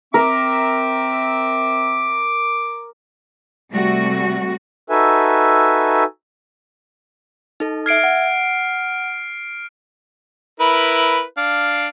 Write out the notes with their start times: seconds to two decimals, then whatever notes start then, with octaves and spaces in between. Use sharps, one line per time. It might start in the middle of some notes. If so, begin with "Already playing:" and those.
0.14 C4 A#4 E5 D6
3.72 C3 G3 A3 F#4
4.90 D#4 F#4 A4 B4 E5 G#5
7.60 D#4 A4
7.86 E5 F6 G#6 C7 D7
8.04 F#5
10.60 E4 A#4 B4
11.37 D4 F5